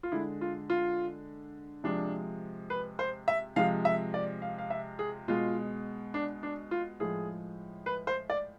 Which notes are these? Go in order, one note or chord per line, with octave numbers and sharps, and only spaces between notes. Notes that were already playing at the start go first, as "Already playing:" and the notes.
F4
D3 G#3 E4
F4
F4
C3 F3 G#3 D4
B4
C5
E5
C3 F3 G#3 F5
E5
D5
F5
F5
E5
G#4
B2 G#3 F4
D4
D4
F4
A2 F3 G#3 G#4
B4
C5
D5